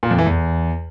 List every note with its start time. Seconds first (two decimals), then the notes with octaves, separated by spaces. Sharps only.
0.03 A#2
0.11 F2
0.18 E3
0.26 E2